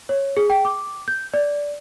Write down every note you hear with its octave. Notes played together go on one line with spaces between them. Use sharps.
C#5
G#4
G5
D6
G6
D5